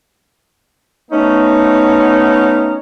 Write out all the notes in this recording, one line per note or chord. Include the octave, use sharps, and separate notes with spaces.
A3 B3 C#4 D#4